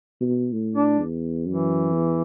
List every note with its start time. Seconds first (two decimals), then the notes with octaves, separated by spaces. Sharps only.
0.20 B2
0.53 A2
0.76 D4
0.99 E2
1.46 F#2 E3
1.93 E2